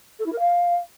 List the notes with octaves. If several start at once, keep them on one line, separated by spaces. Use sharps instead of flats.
A4
E4
A#4
F5